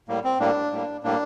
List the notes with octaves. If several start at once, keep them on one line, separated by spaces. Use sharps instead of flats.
A2 G3 A#3
C4
A2 G3 A#3 D4
A2 G3 A#3
A2 G3 A#3 D4